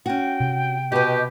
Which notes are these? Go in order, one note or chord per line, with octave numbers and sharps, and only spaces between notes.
C#4 F#4 G5
C3
B2 G4 B4 D#5